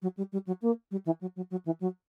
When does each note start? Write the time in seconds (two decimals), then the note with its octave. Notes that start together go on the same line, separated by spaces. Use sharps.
0.02 F#3
0.17 G3
0.32 G3
0.47 F#3
0.62 A#3
0.91 G3
1.06 E3
1.21 F#3
1.36 F#3
1.51 F#3
1.66 E3
1.81 F#3